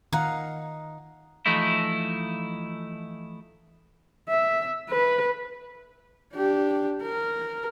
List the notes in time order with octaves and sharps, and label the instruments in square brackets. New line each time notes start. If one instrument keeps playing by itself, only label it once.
[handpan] D#3 F5 [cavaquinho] D#4 F#5
[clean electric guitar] E3 F3 A3 D#4 E4
[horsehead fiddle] E5
B4
D4 G4
A#4